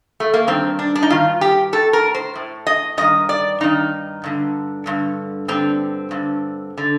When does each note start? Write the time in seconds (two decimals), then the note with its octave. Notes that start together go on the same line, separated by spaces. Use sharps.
0.20 A3
0.34 A#3
0.47 G2 D#3 C4
0.79 D4
0.95 D4
1.03 D#4
1.10 G2 D#3 F4
1.41 G4
1.73 A2 A4
1.93 A#4
2.14 C5
2.35 A2
2.67 D#5
2.97 G2 D#3 D#5
3.29 D5
3.60 G2 D#3 D#4
4.24 G2 D3
4.86 G2 D3
5.48 G2 D3 C4
6.11 G2 D3
6.77 D3